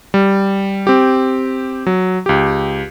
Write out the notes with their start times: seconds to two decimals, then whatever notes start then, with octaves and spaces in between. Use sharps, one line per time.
0.14 G3
0.87 C4 G4
1.86 F#3
2.26 C#2 G4